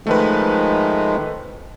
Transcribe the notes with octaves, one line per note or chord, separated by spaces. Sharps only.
D#3 F3 G#3 A3 B4